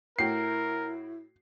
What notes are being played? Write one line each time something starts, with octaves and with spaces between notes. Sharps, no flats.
A2 E4 F#4 A#4 G5 C7